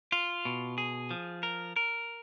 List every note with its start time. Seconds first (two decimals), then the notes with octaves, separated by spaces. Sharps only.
0.12 F4
0.45 B2
0.78 G#4
1.11 F3
1.43 A#4
1.76 A#4